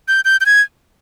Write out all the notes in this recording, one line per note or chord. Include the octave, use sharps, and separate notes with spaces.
G6
G6
G6
G#6